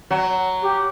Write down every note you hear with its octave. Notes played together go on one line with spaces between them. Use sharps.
F#3
G4